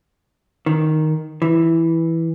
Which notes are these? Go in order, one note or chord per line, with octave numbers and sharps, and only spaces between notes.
D#3
E3